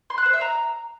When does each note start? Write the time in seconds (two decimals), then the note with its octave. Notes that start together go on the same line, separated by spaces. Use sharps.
0.10 C6
0.18 F#6
0.26 C5
0.33 E5
0.41 A#5